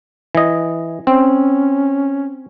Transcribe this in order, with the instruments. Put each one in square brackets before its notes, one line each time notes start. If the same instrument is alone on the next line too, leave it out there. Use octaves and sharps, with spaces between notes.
[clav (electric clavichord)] E3 D#5
[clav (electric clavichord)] C4 [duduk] C#4